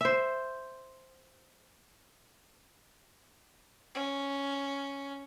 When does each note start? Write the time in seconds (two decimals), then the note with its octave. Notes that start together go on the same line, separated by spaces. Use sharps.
0.01 C5 E5
3.95 C#4